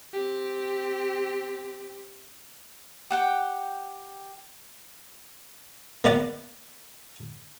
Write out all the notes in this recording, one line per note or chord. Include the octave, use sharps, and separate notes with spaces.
C4 G4
G4 F#5 G5
A#3 B3 D5 F#5